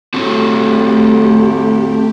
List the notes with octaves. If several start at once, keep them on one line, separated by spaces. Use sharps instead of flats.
A3 C4 F#4 G4 A4